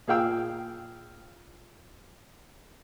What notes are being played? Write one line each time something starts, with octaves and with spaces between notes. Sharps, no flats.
A#2 G#4 F5 G5 E6